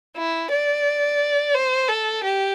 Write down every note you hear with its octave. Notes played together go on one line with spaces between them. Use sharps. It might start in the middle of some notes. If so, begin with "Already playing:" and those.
E4
D5
C5
A4
G4